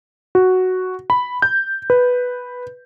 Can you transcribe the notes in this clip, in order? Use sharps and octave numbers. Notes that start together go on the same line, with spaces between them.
F#4
B5
G6
B4